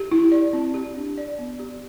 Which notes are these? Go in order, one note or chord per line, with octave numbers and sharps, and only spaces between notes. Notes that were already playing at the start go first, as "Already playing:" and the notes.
Already playing: G4
E4
D5
C4
G4
D4
D5
B3
G4